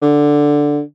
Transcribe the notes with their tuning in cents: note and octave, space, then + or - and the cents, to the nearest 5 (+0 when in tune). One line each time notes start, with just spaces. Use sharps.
D3 +0